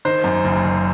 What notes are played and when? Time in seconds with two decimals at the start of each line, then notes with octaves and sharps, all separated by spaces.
0.05 D#3 C5
0.24 F#2
0.45 F#1
0.64 F#1